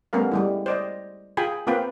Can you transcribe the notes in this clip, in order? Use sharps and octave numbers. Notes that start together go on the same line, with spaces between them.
G3 A3 B3 C#4 A#4 F5
G3 G#3 E4
C5 D5 D#5
F4 G#4 G5 G#5 B5
A#3 C4 F4 B4 F5 G5